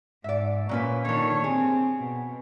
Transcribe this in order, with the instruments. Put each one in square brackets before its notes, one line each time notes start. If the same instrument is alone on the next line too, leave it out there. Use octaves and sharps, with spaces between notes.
[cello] G#2 [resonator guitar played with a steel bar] D5 E5
[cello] A#2 [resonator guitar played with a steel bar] F#3 C#4 B4
[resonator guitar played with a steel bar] D3 A4 [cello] D#3 C#5
[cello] C4 [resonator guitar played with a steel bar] G#4
[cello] B2